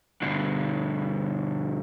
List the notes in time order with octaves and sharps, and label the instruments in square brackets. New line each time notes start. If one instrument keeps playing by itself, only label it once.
[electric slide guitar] G2 B2 D3